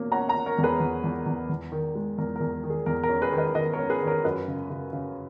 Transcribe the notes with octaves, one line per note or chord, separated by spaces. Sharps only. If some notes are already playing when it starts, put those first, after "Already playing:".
Already playing: E2 B2 A#3 C#4
C#4 F#5 A#5
F#5 A#5
C#4
A#4 C#5
E2
G#4 B4
E2
E2
E2
E2
D#3
G#3
E2 A#4
A#4
E2
A#4
D#3
G#4
E2 A#4
A#4
C#4
G#4 B4
D#3
B4 D#5
D#3 B4 D#5
A#4 C#5
C#4
G#4 B4
D#3
A#4 C#5
F#2 B4 D#5
C#3
C#3
C#3